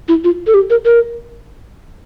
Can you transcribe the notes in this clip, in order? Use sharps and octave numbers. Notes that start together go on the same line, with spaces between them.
E4
F4
A4
G4
A#4
A#4